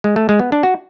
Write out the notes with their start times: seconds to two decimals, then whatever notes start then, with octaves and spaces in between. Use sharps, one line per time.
0.04 G#3
0.16 A3
0.29 G#3
0.39 B3
0.52 D4
0.63 F#4